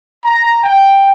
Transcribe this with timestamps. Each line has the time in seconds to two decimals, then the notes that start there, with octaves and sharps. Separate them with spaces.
0.25 A#5
0.64 G5